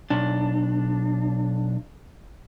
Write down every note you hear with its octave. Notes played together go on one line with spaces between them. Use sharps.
B1 D4